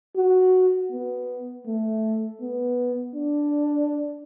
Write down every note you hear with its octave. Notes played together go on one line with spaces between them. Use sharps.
F#4
B3
A3
B3
D4